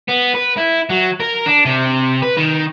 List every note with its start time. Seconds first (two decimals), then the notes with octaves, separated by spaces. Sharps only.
0.08 B3
0.34 B4
0.57 E4
0.89 F#3
1.20 A#4
1.46 D4
1.65 C3
2.22 B4
2.37 D#3